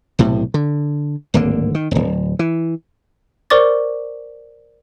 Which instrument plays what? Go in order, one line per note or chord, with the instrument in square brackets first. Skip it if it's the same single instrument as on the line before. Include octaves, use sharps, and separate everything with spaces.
[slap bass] B1 A2 C3
D3
D1 G#1 D3 A#3
D#3
D1 G1
E3
[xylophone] A#4 C5 D5 C#6 D6 A6